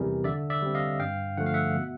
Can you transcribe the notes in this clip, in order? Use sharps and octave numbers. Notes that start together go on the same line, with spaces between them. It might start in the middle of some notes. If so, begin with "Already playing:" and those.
Already playing: E2 C3 E3 G3 G#4 A#4
D3 D5 E5
D5 E5
G3 C4
D#5 F5
G2 F5 G5
D3 F3 A3 F#5
F5
E5 F#5
B2